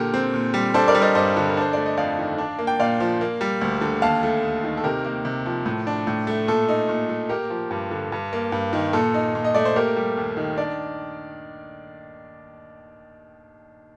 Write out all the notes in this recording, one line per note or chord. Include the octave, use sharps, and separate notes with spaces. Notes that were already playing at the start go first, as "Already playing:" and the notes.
Already playing: A#2 D3 G4 A#4
C4
A#2
G3
D4 A4 C5
A#4 D5
G3
C5 D#5
G2 C5 D#5
D3
A#4
D4 C5
A3 D5
D#5
F2 D5 F5
D#3
D4
A#3
G5
A#2 D5 F5
F3
A#3
G3
D2
D3
D#2 F5 A5
A3
D#2
D#3
A4
C3 G4 A#4
A#3
C3
F3
A2
D4
A2
A3
A#2 A4
D#4
A#2
A3
A#3 G4 A#4
F3
G2
D3
G2
A#3
G2
D#3
A#2 A4
D#4
A#2
D#5
A3 D5
C5
A#3 G4 A#4
G3
D#2
D#3
D4 D5